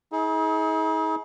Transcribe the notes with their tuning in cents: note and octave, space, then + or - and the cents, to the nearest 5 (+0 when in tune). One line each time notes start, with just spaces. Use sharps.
D#4 +45 G#4 +30